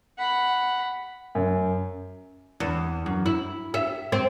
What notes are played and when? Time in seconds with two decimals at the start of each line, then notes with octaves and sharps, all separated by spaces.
0.18 F#5 B5
1.35 F#2
2.60 E2
3.06 F#2
3.26 E4
3.74 E5
4.12 C4